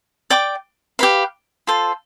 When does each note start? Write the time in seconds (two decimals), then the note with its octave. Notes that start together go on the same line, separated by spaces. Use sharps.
0.30 D5 G5 D6
0.99 G4 B4 F5
1.67 F4 A4 C5